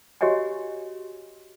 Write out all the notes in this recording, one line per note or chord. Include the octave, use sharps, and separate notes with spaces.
F#4 G4 C#5 D#5 F#5 G#5